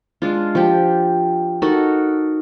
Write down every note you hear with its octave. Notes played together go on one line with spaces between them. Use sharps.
G#3 D4 F4
F3 G4
D#4 F#4 A4 A#4